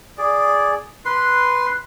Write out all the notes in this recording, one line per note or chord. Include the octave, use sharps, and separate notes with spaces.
G#4 D5
B4 C6